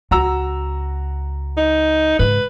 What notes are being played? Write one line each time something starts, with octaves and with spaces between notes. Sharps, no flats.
C#2 F#4 A#5 E6
D#4
G#2 C#3 B4